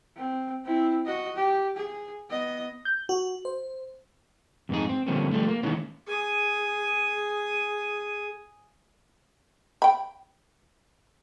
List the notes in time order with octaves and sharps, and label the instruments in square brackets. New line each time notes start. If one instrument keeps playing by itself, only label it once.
[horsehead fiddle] C4
C4 E4
F#4 D#5
G4
G#4
B3 D#5
[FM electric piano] G6
F#4
C5
[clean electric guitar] F2 G#2 D#4 G#4
C4
D3 F3 G3 A#3 C4 C#4
F3 G3 A3
A#3
D#3 E3 G#3 A#3 B3 C#4
[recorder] G#4 [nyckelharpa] G#5 D#6
[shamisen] G5 B5